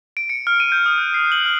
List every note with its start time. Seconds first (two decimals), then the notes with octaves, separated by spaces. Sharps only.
0.17 D7
0.30 C#7
0.47 F6
0.60 D#7
0.72 G6
0.86 D#6
0.98 F#6
1.14 C7
1.32 F#7
1.46 F6